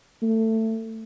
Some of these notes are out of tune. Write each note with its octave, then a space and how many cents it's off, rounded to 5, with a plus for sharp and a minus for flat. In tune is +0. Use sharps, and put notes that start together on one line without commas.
A3 +20